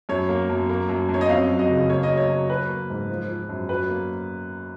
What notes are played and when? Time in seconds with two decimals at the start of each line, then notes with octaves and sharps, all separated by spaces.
0.09 F#2 C#5
0.29 A#3
0.49 F#2
0.69 A#3
0.89 F#2
1.09 F#2
1.14 C#5
1.21 D#5
1.29 F2 F5
1.49 F#3
1.59 D#5
1.70 C#3
1.89 A#3 C#5
2.03 D#5
2.09 F#3
2.17 C#5
2.29 F#3
2.49 F#3 B4
2.69 A#3
2.90 G#2
3.10 F3
3.29 F3
3.49 F#2
3.69 F#3 B4
3.90 A#3